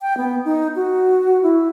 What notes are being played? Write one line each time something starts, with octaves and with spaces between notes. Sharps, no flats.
G5
B3
D#4
F#4
E4